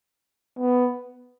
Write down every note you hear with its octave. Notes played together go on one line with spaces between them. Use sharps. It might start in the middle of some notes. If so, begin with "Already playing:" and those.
B3